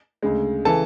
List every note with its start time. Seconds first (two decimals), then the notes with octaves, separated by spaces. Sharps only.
0.23 D2 C#3 G#3
0.65 C#3 E3 A4 A5